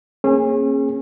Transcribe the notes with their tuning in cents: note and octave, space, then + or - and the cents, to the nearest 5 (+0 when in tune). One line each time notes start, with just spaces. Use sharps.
A#3 +0 C#4 -35 G#4 +0